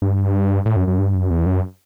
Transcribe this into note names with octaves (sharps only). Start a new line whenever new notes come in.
G2
A2
F#2
F#2
G2
F#2
E2
F#2